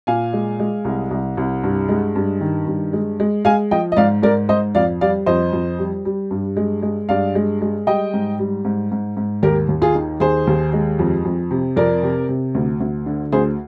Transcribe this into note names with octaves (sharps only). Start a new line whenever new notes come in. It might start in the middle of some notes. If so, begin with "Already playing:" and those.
A#2 F5 G#5
G#3
G#3
C2
C2
C2
G2
G#3
G2
D#3
G2
G#3
G#3
G#3 F5 G#5
F3 D#5 G5
D#5
G#2 D5 F5
G#2 A#4 D5
G#2 C5 D#5
F2 D5 F5
G3 D5 F5
F2 C5 D#5
F2
G3
G3
G2
G#3
G#3
G2 D5 F5
G#3
G#3
G3 D#5 G5
G#2
G3
G#2
G#2
G#2
D#2 G4 A#4
D#2
F4 G#4
D#3
D#2 G#4 C5
D#2
G#3
F2
F2
C3
F2 A#4 D5
C3
C3
D2
D2
D3
D2 G#4 C5